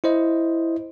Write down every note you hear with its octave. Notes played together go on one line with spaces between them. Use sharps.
E4 C5 D#5